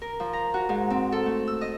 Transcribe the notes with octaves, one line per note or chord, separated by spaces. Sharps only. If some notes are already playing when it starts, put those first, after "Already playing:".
A#4
F3
A#5
F#4
G#2
C4
A4
A3
E6
D#5